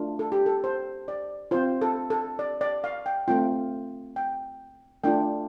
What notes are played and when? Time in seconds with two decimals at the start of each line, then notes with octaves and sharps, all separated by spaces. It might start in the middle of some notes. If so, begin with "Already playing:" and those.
Already playing: A3 D4 F4
0.19 A4
0.32 G4
0.46 A4
0.64 C5
1.08 D5
1.51 C4 F4 C5
1.81 A4
2.10 A4
2.39 D5
2.61 D5
2.84 F5
3.06 G5
3.28 A3 C4 F4 G5
4.16 G5
5.04 A3 D4 F4 G5